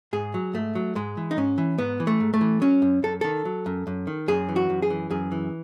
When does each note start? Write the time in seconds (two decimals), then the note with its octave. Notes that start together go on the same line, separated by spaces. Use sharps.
0.13 G#2 G#4
0.34 F#3
0.54 G#2 A3
0.75 F#3
0.95 G#2 G#3
1.17 E3
1.31 D#4
1.37 G#2 C#4
1.58 E3
1.78 G#2 B3
2.00 E3
2.07 A3
2.20 G#2
2.34 A3
2.41 E3
2.61 F#3 C#4
2.82 F#2
3.03 F#2 A4
3.21 D#3 A4
3.45 F#3
3.66 F#2
3.87 F#2
4.07 D#3
4.28 F#2 G#4
4.49 E3
4.56 F#4
4.70 F#2
4.82 G#4
4.90 E3
5.11 F#2 G#4
5.32 E3